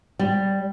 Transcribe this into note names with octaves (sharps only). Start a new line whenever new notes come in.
G3